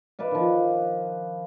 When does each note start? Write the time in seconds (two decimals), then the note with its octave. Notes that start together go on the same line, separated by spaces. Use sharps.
0.19 B4 D5 E5 F5
0.31 D#3 F3